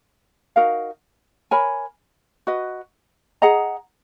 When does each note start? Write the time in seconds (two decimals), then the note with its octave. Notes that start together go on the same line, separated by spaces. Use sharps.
0.56 D#4 F#4 A#4 F5
1.51 A#4 C#5 G#5 B5
2.47 F#4 B4 D#5
3.42 G#4 D#5 F#5 A#5